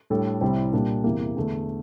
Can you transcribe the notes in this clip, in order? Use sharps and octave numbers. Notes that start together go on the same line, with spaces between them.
A2 G3 D4 A4
C2 C3 G3 C4 E4
A#2 G3 A#3 D4
E2 C3 E3 A#3
E2 D3 A3 D4